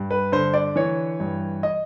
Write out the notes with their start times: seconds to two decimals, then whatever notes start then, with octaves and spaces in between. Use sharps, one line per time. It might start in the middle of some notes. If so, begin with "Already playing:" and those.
Already playing: G2
0.11 B4
0.32 D3 C5
0.54 D5
0.76 E3 C#5
1.20 G2
1.63 D#5